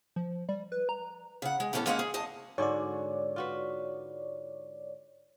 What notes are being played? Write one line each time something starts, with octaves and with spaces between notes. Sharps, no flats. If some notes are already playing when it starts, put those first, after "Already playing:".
F3
G3
B4
A#5
C#3 F#5
G#3
A2 E3 B3 C#4 G#4 A4
G#3 A#3 C#4 F5 F#5
G#4
E2 D#5 A5
G#2 D3 F#4 C#5 D5
F4 F#4 B4